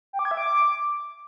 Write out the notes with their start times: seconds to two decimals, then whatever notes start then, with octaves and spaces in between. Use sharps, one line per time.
0.13 G5
0.19 D6
0.25 G#6
0.31 E5
0.37 D6